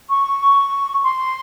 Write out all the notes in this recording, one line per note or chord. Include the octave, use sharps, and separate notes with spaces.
C#6
C6